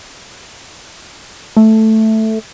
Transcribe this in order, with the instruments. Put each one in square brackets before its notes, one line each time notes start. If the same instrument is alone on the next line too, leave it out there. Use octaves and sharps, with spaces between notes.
[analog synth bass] A3